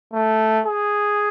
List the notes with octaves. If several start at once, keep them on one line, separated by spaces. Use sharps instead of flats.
A3
G#4